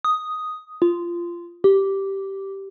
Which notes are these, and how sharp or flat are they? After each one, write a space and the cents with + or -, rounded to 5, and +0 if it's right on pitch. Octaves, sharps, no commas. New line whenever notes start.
D#6 +0
F4 -15
G4 -10